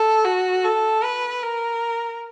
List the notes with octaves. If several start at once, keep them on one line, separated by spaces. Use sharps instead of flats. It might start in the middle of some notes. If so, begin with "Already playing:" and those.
Already playing: A4
F#4
A4
B4
A#4